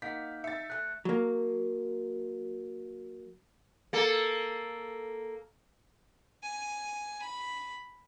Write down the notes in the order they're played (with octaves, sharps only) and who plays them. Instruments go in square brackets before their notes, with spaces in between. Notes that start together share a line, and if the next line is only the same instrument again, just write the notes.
[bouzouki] A#3 [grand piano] D#4 F#5 [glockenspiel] G6 [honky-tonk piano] B6
[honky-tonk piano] E5 A6 [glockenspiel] C#7
[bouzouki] A3 G#4 A4 [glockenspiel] F#6
[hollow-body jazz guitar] F#3 A#3
[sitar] A#3 A4
[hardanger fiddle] G#5
B5